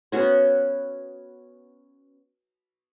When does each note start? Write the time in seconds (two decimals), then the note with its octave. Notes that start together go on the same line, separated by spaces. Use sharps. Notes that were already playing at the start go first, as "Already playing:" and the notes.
0.12 B3 C#4 F#4 C#5